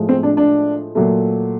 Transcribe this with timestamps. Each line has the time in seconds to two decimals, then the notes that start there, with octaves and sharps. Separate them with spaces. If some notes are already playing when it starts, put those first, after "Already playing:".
Already playing: A2 F3 G#3
0.09 C4
0.23 D4
0.37 D4
0.95 A#2 F#3 A3